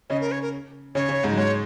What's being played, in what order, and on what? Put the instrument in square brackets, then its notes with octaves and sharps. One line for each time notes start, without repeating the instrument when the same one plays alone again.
[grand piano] C#3 C#4 [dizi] D#5
[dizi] A#4
C#5
A#4
[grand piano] C#3 C#4 [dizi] C#5
[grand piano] C#3 C#4
G#2 G#3
F#3
[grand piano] G#2 G#3 [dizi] C#5